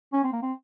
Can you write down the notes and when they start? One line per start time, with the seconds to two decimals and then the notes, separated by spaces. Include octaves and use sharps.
0.13 C#4
0.24 C4
0.33 A#3
0.42 C4